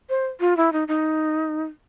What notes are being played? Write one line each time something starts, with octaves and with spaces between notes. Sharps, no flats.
C5
F4
E4
D#4
D#4